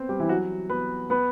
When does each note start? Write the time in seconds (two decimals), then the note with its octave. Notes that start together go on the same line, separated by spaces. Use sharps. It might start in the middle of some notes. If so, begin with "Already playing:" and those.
Already playing: B3 C4 C5
0.09 G3 G4
0.20 E3 E4
0.29 F#3 F#4
0.70 B3 B4
1.10 B3 B4